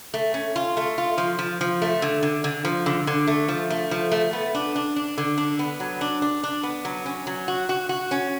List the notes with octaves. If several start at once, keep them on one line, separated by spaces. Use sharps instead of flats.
A3
C#4
F4
A3
F4
F3
F3
F3
A3
D3
D3
D3
F3
D3
D3
A3
F3
A3
F3
A3
B3
D4
D4
D4
D3
D4
B3
F#3
D4
D4
D4
B3
F#3
C#4
F#3
F#4
F#4
F#4
C#4